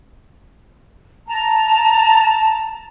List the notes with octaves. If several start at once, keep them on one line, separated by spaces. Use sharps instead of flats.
A5 A#5